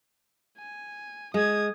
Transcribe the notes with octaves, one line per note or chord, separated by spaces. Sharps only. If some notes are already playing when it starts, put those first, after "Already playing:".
G#5
G#3 D#6 G#6